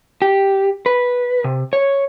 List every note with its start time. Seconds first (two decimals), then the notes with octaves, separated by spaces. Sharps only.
0.22 G4
0.86 B4
1.44 C3
1.73 C#5